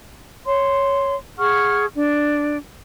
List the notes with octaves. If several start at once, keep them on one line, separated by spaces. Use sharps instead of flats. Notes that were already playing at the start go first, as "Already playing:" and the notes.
C#5 C6
G#4 F#5 C#6 F6
D4